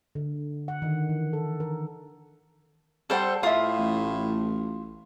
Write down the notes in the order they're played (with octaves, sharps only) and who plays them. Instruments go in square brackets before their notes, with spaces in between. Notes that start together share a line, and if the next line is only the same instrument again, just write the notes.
[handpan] D3
F#5
D#3
E3
A4
A#4
[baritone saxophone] G3 [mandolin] A4 C5 [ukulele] D5 F#5
[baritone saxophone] A2 [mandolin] F4 D#6 [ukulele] E5 F5
[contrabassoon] A1